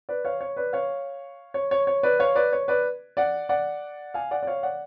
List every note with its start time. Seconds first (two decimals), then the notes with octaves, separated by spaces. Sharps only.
0.09 B4 D5
0.25 C#5 F5
0.41 C#5
0.57 B4 D5
0.73 C#5 F5
1.54 C#5
1.71 C#5
1.87 C#5
2.03 B4 D5
2.19 C#5 F5
2.35 B4 D5
2.53 C#5
2.68 B4 D5
3.17 D5 F#5
3.49 D5 F#5
4.14 F5 G#5
4.31 D5 F#5
4.43 D5
4.47 C#5 F5
4.63 D5 F#5